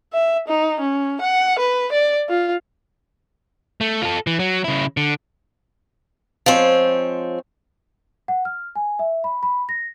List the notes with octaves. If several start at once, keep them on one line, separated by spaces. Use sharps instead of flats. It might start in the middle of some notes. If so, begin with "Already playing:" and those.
E5
D#4
C#4
F#5
B4
D5
F4
A3
F4 A4
E3
F#3
C#3 E4
D3
F3 G#3 C4 C#5
F#5
F6
G#5
E5
B5
B5
A#6